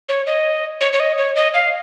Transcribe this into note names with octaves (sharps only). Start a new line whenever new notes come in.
C#5
D#5
C#5
C#5
D#5
C#5
D#5
F5